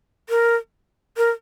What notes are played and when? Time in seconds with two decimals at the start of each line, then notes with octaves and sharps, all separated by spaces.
0.29 A#4
1.17 A#4